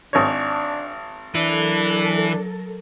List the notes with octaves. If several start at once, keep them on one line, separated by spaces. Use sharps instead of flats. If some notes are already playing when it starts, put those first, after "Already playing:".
G#1 D4 C#5
E3 F#3 D4 E4 A4 A#4